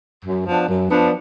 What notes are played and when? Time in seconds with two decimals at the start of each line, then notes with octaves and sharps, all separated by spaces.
0.24 F#2
0.46 F3 B3 D4
0.67 F#2
0.89 F3 B3 D4